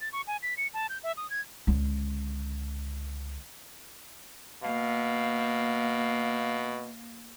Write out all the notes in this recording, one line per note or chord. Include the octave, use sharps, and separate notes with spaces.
A6
C#6
G#5
B6
C#7
A5
G6
E5
D#6
G#6
C#2 D3
B2 A#3 F5